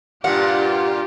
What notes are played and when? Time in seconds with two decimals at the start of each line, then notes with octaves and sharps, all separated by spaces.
0.24 G2 A#2 F4 G4 F#5